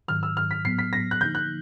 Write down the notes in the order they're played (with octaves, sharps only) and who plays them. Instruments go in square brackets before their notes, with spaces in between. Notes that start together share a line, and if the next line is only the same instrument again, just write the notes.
[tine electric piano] G#2 D#3 F#3 [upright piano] F6
[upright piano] E6
F6
B6
[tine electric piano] A2 F#3 B3 [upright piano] C7
[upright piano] B6
A#6
F#6
[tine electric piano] D3 F3 A#3 D#4 [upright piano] G6
[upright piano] F#6